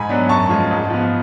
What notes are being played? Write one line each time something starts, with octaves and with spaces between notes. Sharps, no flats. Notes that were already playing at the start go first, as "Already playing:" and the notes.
Already playing: G#2 G#5 B5
F#3 B3 D4
F#2 A5 C#6
F3 G#3
G#2
F3 B3